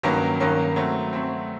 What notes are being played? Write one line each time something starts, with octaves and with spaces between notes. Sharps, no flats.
G2 D#3 F#3 A#3 C#4
G2 D#3 F#3 A#3 C#4
F#3 A3 C4
F#3 A3 C4